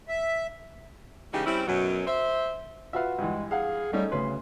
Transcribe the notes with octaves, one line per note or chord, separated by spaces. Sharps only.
E5
C#3 E3 G#3 C#4 D#4 G4
G3 C4 C#4 E4
F#2 B2 F#3
C5 E5
F4 F#4 B4 E5 F5
G2 E3 G#3
G#4 F5 F#5
G3 A3 C#4 D#4
D2 C#3 B4 C6